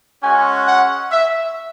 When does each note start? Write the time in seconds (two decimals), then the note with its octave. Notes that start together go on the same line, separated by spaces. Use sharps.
0.21 G#3 C#4 F#4 G#5
0.67 F#5
1.11 E5